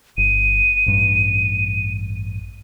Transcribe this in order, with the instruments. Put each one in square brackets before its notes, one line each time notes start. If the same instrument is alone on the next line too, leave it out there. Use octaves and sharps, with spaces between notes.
[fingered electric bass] G1 [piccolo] D#7
[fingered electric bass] A1 G2